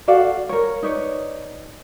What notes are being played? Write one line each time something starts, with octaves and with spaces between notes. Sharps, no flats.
F#4 A4 D5 F5
A#4 C#5
D#4 B4 C#5 D5